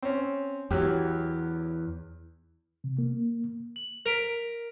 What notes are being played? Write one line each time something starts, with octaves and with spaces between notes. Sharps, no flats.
C4 C#4
E2 F#3 G4
C3
A#3
F#7
A#4 B6 D7 F7